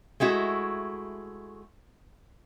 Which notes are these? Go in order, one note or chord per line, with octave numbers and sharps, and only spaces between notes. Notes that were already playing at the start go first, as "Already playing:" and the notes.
G#3 A3 E4 F#4